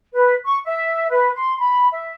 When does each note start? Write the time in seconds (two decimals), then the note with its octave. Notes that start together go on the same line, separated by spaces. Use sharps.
0.13 B4
0.44 C#6
0.65 E5
1.11 B4
1.34 C6
1.59 B5
1.91 E5